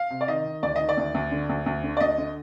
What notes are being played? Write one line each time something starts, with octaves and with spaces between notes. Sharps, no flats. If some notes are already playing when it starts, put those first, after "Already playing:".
Already playing: F5
C3
D5
D#3 D#5
D#3
D2 D5
D#3 D#5
D5
D2
D2
D3
D2
D2
D3
D5
D2 D#5
D3